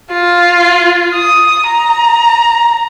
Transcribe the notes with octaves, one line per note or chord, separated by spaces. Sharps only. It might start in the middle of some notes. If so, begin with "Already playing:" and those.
F4
D#6
A#5